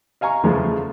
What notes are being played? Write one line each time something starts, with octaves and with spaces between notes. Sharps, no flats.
D#5 F5 G#5 A#5 C#6
E2 C#3 F3 G#3 A3